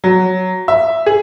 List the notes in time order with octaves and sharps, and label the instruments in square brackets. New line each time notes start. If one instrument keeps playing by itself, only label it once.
[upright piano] F#3
E5
G#4